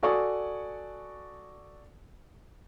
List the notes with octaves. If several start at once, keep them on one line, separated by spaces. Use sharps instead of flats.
F#4 A4 D5 G#5 C#6 D#6